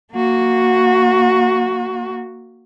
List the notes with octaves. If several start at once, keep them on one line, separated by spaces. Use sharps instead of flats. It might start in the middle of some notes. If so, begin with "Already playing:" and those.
A#3 F#4